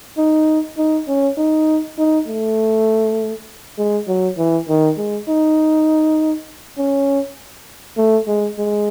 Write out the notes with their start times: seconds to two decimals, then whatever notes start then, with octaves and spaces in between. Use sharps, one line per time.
0.17 D#4
0.77 D#4
1.08 C#4
1.38 D#4
1.98 D#4
2.28 A3
3.78 G#3
4.07 F#3
4.38 E3
4.69 D#3
4.97 G#3
5.29 D#4
6.78 C#4
7.98 A3
8.28 G#3
8.58 G#3